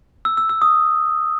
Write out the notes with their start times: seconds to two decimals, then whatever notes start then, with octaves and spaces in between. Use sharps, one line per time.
0.25 E6
0.37 E6
0.49 E6
0.62 D#6